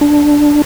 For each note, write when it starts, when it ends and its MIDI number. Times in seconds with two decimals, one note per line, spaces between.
0.01 0.62 62